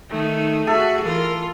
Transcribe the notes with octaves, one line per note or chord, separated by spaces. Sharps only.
D#3 A3 D#4
F#4 G#4 A4 E5
E3 F4 A#4